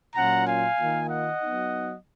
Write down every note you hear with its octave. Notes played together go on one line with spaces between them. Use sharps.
A#2 F#3 C#4 F4 F#5 A#5
F5 G#5
D#3 A#3 F4
D#5 F#5
F#3 B3 D#4